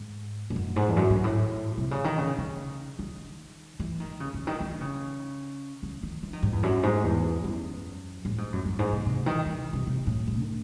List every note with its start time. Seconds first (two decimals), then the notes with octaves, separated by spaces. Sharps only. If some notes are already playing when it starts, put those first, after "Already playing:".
Already playing: G#2
0.50 G#2
0.56 F#2
0.76 G#2
0.88 E2
0.97 F#2
1.10 G#2
1.24 A2
1.78 C3
1.91 C#3
2.04 D#3
2.18 C#3
2.38 C#3
2.99 D#3
3.79 E3
4.00 D#3
4.20 C#3
4.34 C#3
4.47 D#3
4.60 D#3
4.81 C#3
5.83 C#3
6.03 D#3
6.23 E3
6.33 D#3
6.43 G#2
6.53 E2
6.63 F#2
6.83 G#2
7.04 E2
7.44 F#2
8.25 A2
8.38 G#2
8.52 F#2
8.65 F#2
8.79 G#2
8.93 C3
9.06 C3
9.26 D#3
9.46 D#3
9.73 C3
9.87 C3
10.07 A2
10.27 A2
10.41 D#3